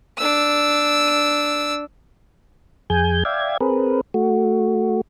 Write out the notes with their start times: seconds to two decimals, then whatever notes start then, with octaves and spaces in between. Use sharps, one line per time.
0.18 D4 E6
2.90 F2 G#4 G#5 G6
3.25 D5 E5 F5 G5 G#6
3.60 C4 G#4 A#4 B4
4.14 A3 F#4